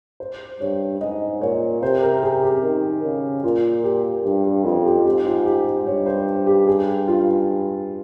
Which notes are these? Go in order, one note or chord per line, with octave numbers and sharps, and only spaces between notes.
C5
G2 C#5
G#2 D#5
A#2 C#5
C3 C5
A#4
G#4
G4
D#3
C#3
A#2 F4
G4
G2 G4
G4
F2 F4
G4
F4
G#2 G4
F4
G4
G2 C#5
C5
G4
G#4
F4